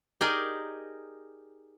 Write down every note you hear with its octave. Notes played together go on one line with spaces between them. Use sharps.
D#4 G4 G#4 A#4 D5 D#5